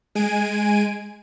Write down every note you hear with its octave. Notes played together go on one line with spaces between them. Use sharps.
G#3 G#5 D7 D#7